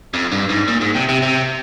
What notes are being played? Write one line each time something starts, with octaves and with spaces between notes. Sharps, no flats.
F2
G2
G#2
A#2
G#2
C3
C3
C3